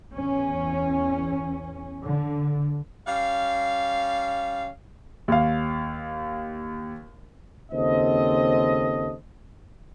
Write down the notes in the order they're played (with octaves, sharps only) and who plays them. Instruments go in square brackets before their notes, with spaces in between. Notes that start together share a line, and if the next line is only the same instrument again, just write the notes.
[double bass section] E2 C#4
D3
[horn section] G3 C#4 F5
[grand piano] D#2 F5
[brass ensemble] D#2 C#3 C4 A4 C5 D#5